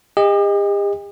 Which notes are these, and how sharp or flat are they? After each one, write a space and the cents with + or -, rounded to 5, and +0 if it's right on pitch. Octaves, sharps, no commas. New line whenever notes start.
G4 +45 D#5 +0